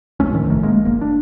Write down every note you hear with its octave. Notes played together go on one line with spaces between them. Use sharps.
F1 C#2 A3 C#4
D2 A2 D#3 F3
D1 A#1 D#3 A3
G#3 A#3
F#1 A#3
D4